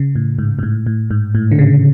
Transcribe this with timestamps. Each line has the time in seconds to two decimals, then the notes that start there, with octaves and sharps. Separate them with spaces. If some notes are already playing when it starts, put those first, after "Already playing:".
Already playing: C#3
0.15 A2
0.39 G#2
0.59 G#2
0.63 A2
0.86 A2
1.11 G#2
1.35 A2
1.51 D3
1.59 C#3